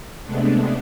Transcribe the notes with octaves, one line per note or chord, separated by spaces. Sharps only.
C3 G#3 A3 B3 D4